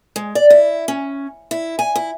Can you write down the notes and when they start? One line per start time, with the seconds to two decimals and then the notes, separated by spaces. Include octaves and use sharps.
0.16 G#3
0.35 D5
0.50 E4
0.88 C#4
1.51 E4
1.79 G#5
1.96 E4